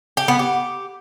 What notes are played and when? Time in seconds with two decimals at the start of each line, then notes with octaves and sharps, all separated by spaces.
0.17 G4
0.28 B3
0.39 G4